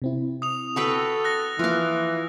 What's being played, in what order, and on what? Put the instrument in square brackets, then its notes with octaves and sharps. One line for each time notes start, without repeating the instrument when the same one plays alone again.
[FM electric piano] C3 C4 E4
[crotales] D#6 F7
[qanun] F#4 B4 G5 [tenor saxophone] A4
[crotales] F#6 A#6
[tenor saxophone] E3 [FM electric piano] F3 A#3 [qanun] F4 F5